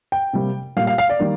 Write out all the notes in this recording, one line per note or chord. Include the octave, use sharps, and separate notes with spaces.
G5
C3 G3 A#3
A#2 G3 A#3 F5
F5
F5
D5
D#3 G3 A#3